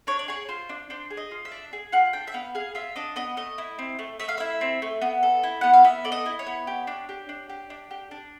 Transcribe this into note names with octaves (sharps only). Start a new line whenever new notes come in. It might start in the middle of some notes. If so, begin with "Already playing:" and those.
D4 C#5
D5
G#4 C#5
F4 C5
D4
D4 C5
G#4
D#5
F4
E5
D4
G#4
F4 F#5
D4 G5
E5
B3 F5
G#4 F5
F4 E5
D4 D#5
B3 D#5
A3 D#5
E4
C4
A3
A3 E5
F5
E4 E5
C4
A3
B3
A4
E4
B3 F#5
F5
B3 E5
A4 D5
D#5
E4
C#5
B3
G4
D4
G4
D4
G4
D4
G4
D4